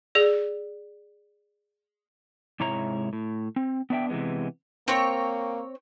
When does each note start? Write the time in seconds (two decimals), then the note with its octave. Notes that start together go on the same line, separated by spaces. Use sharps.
0.15 G#4 D5
2.60 G#2 C3 G#3 E4 C#5 A#5
3.13 A2
3.56 C4
3.90 B3 D4 E5 G5
4.09 C3 E3 F3 G#3 B3
4.88 A#3 C4 C#5 G5